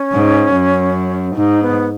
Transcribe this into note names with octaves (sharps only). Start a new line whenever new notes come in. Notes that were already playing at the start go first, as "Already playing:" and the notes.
Already playing: C#4
G#2
F#2
G#2 D#4
B3